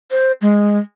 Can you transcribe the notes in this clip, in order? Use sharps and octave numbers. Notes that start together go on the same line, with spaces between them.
C5
G#3